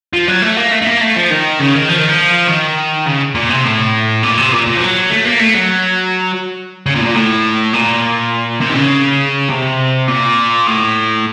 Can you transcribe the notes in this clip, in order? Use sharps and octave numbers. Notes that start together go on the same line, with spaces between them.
F3
F#3
A3
A#3
A3
A3
A#3
A3
F3
D#3
C#3
D#3
F3
D#3
F3
D#3
C#3
A#2
C3
A2
A#2
C3
A#2
A#2
F3
F#3
A3
A#3
A3
F#3
C#3
A#2
A2
A#2
A2
A#2
C3
D#3
C#3
C3
A#2
A2